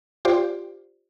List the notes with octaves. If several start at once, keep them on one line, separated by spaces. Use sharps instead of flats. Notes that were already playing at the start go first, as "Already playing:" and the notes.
F4 G4 C5 D5